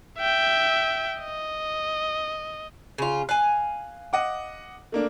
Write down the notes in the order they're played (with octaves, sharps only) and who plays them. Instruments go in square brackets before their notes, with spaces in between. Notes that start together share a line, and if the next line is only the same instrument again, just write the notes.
[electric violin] E5 G5
D#5
[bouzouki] C#3 F4
[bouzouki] F5 G#5 [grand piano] F#6
[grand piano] D#5 F#5 D6
A3 A#3 D4